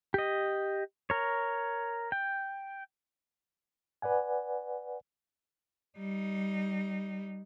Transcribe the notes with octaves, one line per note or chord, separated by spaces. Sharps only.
G4 D#5
A#4 C#5
G5
B4 D5 F#5 G#5
G3 D#4